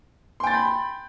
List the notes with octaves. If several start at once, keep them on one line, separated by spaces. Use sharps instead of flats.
G5 B5 C6 G6 A6